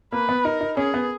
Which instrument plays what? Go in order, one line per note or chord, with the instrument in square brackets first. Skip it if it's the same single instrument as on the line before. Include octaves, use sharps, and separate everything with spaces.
[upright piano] A#3 [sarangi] B4
[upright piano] B3
[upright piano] D#4 [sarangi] A#4
[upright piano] D#4
[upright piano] C#4 [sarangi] G#4
[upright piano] B3